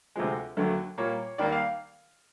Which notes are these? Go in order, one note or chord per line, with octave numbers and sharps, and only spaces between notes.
D2 C3 F3 G#3
D#2 D3 F#3 A3
A#2 G3 A#3 C#5
D#2 D#3 G3 A#3 D5
F5